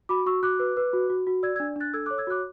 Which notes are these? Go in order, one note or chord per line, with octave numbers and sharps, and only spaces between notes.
F#4 B5 D6
F#4 C#6 E6
F#4 D6 F#6
B4
B4
F#4
F#4
F#4
D5 E6 G#6
E6 G#6
D4
D4 F#6 A6
A4 E6 G#6
D6 F#6
C#5
E6 G#6
F#4 D6 F#6